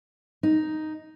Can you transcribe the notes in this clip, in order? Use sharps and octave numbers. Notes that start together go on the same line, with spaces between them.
D#4